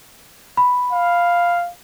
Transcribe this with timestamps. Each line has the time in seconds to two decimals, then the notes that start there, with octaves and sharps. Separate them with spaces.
0.57 B5
0.93 F5